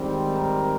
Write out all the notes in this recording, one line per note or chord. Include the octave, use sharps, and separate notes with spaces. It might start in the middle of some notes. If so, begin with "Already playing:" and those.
Already playing: G#2 D#3 G3 C4
A#4